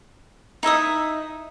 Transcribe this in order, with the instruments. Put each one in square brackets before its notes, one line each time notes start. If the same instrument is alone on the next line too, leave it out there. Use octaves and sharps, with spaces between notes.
[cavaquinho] D#4 E4 E5 D#6